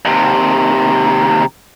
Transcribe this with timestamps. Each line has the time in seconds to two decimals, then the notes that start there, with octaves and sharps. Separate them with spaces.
0.05 D#2 C3